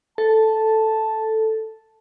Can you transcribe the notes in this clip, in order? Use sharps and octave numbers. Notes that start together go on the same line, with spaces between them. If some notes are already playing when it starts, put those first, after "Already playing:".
A4 A5